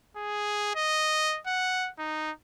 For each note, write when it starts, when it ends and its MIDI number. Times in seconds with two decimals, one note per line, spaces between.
0.17 0.74 68
0.75 1.39 75
1.46 1.89 78
1.99 2.31 63